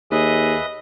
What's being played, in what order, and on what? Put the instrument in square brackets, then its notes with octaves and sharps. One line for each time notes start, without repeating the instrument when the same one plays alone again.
[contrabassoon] D#2 [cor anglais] G#4 [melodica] B4 E5 [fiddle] D#5